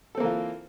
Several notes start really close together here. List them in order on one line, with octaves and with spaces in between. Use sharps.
A4 C4 A#3 E3 F4